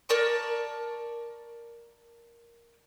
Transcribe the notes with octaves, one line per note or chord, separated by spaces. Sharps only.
A#4 D5 A5 C#6